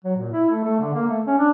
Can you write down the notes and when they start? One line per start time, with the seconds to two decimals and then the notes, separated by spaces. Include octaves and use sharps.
0.04 F#3
0.16 A#2
0.32 E4
0.50 A3
0.64 A3
0.80 D3
0.94 A#3
1.07 A3
1.27 C#4
1.38 D4